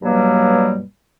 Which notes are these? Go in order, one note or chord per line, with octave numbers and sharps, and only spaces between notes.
G2 B2 F#3 G3 A#3